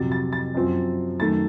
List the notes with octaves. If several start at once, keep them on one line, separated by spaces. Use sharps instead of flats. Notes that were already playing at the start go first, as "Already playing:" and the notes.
Already playing: F2 C3 F#3 A6
A6
A6
F#2 F3 C4
F#2 D#3 A3 A6